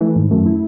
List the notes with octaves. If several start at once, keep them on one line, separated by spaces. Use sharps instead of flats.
E3 A3
G#2 D#3
F#2 A3
E4